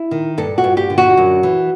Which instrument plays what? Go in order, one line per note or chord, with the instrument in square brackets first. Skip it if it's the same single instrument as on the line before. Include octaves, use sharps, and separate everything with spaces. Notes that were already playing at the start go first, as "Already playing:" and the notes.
Already playing: [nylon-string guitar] E4
D#3
G2 A4
F#4
G2
G4
D3
F#4
F#2
E3